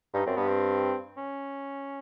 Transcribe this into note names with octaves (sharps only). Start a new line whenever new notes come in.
G2 D#4
F#2 C4
G2 B3
C4
C#4